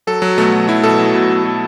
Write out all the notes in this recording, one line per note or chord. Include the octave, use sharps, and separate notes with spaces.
F#3 A4
F#3
B2 A3
F#3
F#3 E4
B2 A4
F#3
B2
B2
F#3